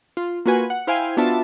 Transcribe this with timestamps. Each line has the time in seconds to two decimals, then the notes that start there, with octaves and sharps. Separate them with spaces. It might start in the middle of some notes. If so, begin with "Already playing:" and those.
0.17 F4
0.46 A#3 F4 F#4 B4 G#5
0.70 F#5
0.87 E4 C5 F5 G5 G#5
1.17 B3 D4 F4 F#4 E5 A5